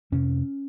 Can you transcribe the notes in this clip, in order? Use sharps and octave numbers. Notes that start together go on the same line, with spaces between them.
F2 C3 C#4